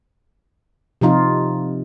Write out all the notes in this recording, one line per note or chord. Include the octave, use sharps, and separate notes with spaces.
C3 F3 D#4 F4